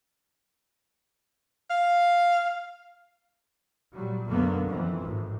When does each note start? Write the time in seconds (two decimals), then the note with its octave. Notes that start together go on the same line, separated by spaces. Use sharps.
1.70 F5
3.94 A#2 F#3 G3
4.28 F#2 B2 D3 F#3 A#3 B3
4.68 F2 E3
5.03 G#1 A2